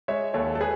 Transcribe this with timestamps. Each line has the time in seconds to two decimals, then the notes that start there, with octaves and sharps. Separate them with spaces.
0.08 G#3 C#5 E5
0.34 D#2 A4 C#5
0.55 A4
0.60 G#4 B4